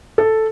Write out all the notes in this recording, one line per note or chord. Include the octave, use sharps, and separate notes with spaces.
A4